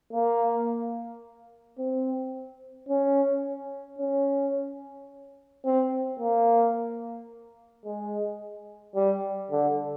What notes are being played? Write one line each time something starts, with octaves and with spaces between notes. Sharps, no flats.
A#3
C4
C#4
C#4
C4
A#3
G#3
G3
D3